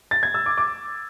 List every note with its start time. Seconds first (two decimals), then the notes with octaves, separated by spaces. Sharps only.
0.11 A6
0.23 G#6
0.34 E6
0.46 D6
0.58 D6